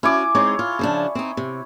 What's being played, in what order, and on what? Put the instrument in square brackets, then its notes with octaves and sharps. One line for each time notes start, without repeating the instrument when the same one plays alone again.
[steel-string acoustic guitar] C#4 F#4 [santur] E4 G#5 D6
[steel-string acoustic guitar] G#3 C4 D#4 [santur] C#5
[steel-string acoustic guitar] F4
C#3 F3 D4
C4 D#4
C3